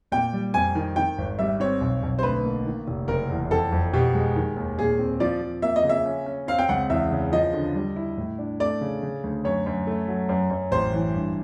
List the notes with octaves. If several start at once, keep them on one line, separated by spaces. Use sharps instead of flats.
A#2 G5
G3
F2 G#5
D#3
D#3 G5
G#1
G3 E5
C4 C#5
B1
B1
C5
D2 B4
A#3
D#3
F1
F#1 A#4
E2
F2 A4
F2
B2 G4
G#3
D#3
D#2
A#2 G#4
C4
F3 D5
F3
A#3 E5
D#5
C#3
E5
C#4
C#4
C4 F5
G5
C#2 F#5
E2 E5
C#3
F3 D#5
D3
G3
E4
A2
D4
A3 D5
C#3
C#3
D2
F#2 C#5
F#2
A3
F#3
F#2
F#2
A1 C5
E3
G2